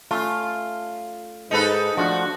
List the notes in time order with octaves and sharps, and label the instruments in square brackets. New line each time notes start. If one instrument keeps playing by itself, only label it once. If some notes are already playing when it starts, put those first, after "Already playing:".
[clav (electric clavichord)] A3 C#4 [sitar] F4
[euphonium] G#2 [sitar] D#4 A4 B4
[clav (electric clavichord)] F3 A3 F#5 [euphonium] D4 [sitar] F#4